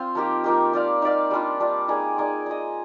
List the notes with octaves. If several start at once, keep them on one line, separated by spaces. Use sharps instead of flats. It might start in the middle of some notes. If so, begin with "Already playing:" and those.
Already playing: C4 F4 C5 F5
F3 A#3 D#4 G4
F3 A#3 D#4 G4
D#4 G4 D5 F5
D#4 G4 D5 F5
G3 D4 F4
G3 D4 F4
A#3 D#4 G#4 D5
A#3 D#4 G#4 D5
D#4 G#4 D#5